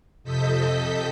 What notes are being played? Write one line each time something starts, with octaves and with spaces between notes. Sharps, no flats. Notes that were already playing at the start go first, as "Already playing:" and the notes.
F2 C3 A4 D#5 G6 B6